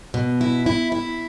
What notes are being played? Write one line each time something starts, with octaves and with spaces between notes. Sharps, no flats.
B2
E4
E4
E4